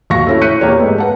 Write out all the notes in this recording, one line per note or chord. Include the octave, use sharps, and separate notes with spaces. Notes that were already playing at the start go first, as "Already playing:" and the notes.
D#2 F#4 F5 C#6 A#6
A3 C#4 E4
C#6 F#6 G6 B6 C#7 D#7
E2 A#3 G4 C#5
G#2 A3 B3
B4 F#5 A5